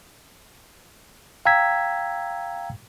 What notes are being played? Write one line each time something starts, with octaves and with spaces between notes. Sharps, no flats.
F5 G5 A#5 E6 G#6 B6